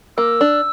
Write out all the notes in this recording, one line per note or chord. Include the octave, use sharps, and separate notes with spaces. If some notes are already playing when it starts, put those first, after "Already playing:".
A#3 E6
D4